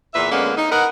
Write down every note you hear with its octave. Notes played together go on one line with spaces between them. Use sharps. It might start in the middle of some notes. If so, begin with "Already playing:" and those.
E2 A#2 B4 E5
D3 G#3 A#3 B3 C#4
D#4
A#4 B4 D#5 F#5